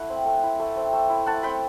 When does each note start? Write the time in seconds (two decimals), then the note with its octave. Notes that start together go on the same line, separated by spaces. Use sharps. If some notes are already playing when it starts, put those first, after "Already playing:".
Already playing: A3 E4 F#5
0.10 C4
0.26 A3
0.43 E4
0.60 A3
0.77 C4
0.93 A3
1.10 E4
1.26 A3 F#5 A5
1.43 C4 G5 B5